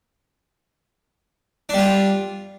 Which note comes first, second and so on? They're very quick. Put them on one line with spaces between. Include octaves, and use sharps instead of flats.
D4 G3 F4